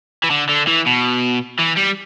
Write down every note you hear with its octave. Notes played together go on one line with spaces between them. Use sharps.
E3
D3
D3
E3
B2
E3
G3